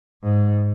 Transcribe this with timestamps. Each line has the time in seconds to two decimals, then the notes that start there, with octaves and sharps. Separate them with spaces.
0.23 G#2